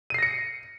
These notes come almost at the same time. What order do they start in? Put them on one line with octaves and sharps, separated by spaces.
D#7 C7 A#6 C#7